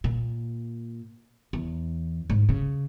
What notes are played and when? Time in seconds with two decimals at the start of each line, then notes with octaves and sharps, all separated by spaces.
0.04 A#2
1.53 E2
2.30 G#2
2.49 C#3